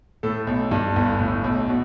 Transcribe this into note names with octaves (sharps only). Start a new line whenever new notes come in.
A2 A4
B1
G2
G1
A2
B1
B2